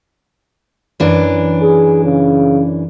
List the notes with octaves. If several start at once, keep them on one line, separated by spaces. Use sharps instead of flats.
F#2 E3 D4
G#4
C#3